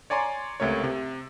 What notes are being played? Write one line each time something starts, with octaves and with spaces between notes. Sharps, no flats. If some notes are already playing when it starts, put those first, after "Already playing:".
C#5 D5 G#5 A#5 C6
C#2 C3 A3 A#4 C#5
C3